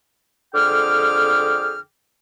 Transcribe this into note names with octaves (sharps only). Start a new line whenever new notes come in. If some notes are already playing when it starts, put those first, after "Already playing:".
F2 D3 G#4 G5 D6 F6